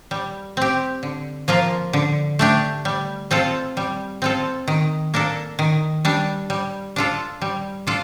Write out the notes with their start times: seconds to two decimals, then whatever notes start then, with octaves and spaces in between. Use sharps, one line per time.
0.11 G3
0.57 C4 G4
1.03 D3
1.48 F3 A#3 F4
1.93 D3
2.39 A3 D4 G4
2.85 G3
3.31 C4 F4 A4
3.77 G3
4.22 C4 F4 A4
4.68 D#3
5.14 A#3 D4 A4
5.59 D#3
6.05 G3 D4
6.50 G3
6.96 D4 F4 A4
7.41 G3
7.87 D4 F4 A4